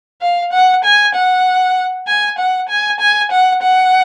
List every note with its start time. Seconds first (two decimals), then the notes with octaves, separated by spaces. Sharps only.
0.21 F5
0.52 F#5
0.84 G#5
1.15 F#5
2.07 G#5
2.38 F#5
2.69 G#5
3.00 G#5
3.31 F#5
3.62 F#5